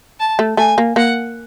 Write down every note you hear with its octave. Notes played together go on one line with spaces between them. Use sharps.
A5
A3
A3 G#5
A#3
A#3 F#5